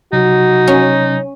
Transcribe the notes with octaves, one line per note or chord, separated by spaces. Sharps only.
C3 F#3 D#4 F#4
C#4